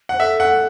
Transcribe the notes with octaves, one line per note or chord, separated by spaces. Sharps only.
C5 F#5
A4 E5
F#5